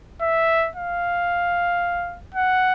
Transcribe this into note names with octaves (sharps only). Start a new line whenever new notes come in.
E5
F5
F#5